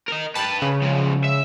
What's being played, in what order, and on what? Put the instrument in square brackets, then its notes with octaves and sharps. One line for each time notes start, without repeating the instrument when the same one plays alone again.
[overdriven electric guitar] A#4 D#5
[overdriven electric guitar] G4 B4 [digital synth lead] A5
[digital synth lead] C#3
[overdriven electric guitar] F3 G#3
E5